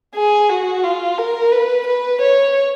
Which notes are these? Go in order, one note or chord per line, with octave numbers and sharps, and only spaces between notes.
G#4
F#4
F4
A#4
B4
B4
C#5